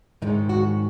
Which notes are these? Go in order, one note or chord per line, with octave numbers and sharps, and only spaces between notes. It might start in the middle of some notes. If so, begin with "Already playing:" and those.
G#2 D#3 G#3 C#4 D#4
F#4